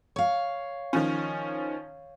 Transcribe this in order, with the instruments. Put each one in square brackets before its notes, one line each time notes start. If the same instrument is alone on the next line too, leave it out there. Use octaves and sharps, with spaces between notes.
[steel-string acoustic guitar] C#5 F5
[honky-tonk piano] D#3 F3 C#4